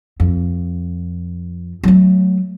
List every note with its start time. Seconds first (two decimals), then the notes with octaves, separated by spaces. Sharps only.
0.20 F2
1.83 F#3 A3